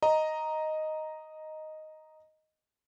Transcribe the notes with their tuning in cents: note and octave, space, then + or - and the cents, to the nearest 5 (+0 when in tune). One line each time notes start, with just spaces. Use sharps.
D#5 +0 A#5 +0